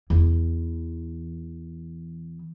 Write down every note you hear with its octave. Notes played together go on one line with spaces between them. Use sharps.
E2 E3